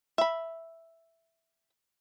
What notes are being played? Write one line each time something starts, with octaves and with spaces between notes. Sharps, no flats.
E5 B5